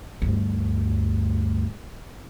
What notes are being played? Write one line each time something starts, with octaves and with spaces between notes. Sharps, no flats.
D2 G2